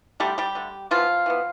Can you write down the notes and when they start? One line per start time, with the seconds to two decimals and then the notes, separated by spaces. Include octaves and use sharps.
0.20 D3 G3 A3 G4
0.38 G3 G4
0.55 D3 A3
0.91 E3 F3 B3 F4
1.26 E3 B3